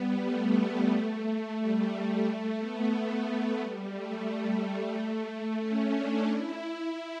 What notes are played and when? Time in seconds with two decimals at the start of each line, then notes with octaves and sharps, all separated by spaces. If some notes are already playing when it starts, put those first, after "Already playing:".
Already playing: G3 B3
0.24 A3
0.91 A3
1.58 G3
2.25 A3
2.58 B3
2.92 A3
3.59 G3
3.93 A3
5.59 C#4
5.93 D4
6.26 E4